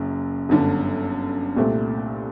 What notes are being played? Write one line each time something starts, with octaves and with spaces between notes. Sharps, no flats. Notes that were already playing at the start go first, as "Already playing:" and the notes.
Already playing: F#1 F#2
G1 F#2 D3
C2 A#2 A3 C4